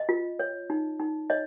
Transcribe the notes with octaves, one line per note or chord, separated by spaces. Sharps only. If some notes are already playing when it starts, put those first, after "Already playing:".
Already playing: D#5
F4
C#5
D#4
D#4
C#5 D#5